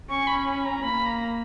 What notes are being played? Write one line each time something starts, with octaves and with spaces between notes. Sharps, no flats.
C#4 C#6
B5
B5
A#5
A#3 B5
A#5